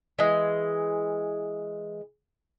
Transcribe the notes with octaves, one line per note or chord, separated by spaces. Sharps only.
E3 G#3